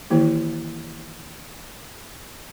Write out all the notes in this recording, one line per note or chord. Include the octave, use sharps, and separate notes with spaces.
D#3 E3 A#3 E4 G4